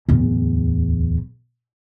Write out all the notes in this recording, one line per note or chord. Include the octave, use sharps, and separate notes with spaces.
D1 E2